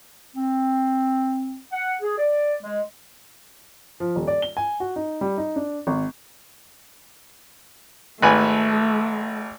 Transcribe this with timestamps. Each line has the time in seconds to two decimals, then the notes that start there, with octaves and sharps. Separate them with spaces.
0.36 C4
1.72 F#5
2.01 G#4
2.18 D5
2.61 G#3
4.00 F3
4.16 D#1
4.27 D5
4.42 G7
4.57 G#5
4.80 F#4
4.96 D#4
5.21 G3
5.37 D#4
5.56 D4
5.87 G#1
8.22 G#1 A3 B4 G#5